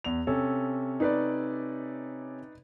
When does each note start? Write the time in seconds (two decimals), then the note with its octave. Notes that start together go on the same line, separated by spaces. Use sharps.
0.04 E2 F7
0.27 C3 C#4 A4
1.00 D#4 B4 D5